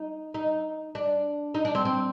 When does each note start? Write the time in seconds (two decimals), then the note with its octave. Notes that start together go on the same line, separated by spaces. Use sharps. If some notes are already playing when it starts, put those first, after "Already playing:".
Already playing: D#4
0.34 D#4
0.95 D4
1.54 D#4
1.65 D4
1.75 C4
1.85 C4